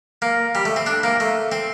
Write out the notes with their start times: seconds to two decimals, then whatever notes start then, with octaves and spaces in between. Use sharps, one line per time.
0.22 A#3
0.55 G3
0.65 A3
0.76 C4
0.86 D4
1.03 A#3
1.20 A3
1.52 C4